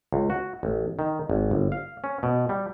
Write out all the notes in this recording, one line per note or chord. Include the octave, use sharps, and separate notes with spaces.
C#2
F#4
A1
D#3
G#1
G1
F5
C#4
B2
G3